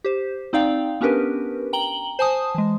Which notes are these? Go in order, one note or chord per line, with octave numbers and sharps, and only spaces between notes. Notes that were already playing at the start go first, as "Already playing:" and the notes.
G4 C5
C4 D#4 D5 F5 G5
B3 C#4 D4 G4 A#4 B4
G5 A#5 F#7 G7
C5 G#5 A5 D#6
E3 G#3